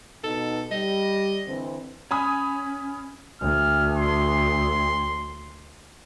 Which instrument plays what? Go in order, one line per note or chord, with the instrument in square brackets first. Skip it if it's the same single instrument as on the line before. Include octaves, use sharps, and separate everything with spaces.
[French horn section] B2 D#4 [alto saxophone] A4
[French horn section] G3 [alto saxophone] D#5
[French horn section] D3 E3 C4
[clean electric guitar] C#4 [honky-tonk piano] G#5 B5 D#6
[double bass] D2 [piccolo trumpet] F6
[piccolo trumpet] C6